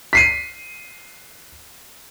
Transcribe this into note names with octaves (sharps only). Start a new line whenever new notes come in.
B6 C7 D#7